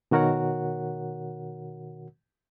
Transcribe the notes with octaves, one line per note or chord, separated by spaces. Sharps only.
B2 D#3 F#4 A#4 C#5 F#5